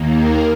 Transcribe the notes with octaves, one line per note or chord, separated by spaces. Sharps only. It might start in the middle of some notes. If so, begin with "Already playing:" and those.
Already playing: D#2 D#3 A#3
A#4